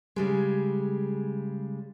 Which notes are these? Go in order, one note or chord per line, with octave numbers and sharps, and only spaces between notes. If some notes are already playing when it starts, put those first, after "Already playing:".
C#3 G3 G#3